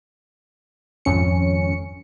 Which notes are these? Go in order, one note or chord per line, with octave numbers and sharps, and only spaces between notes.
G#1 F2 C#4 C#7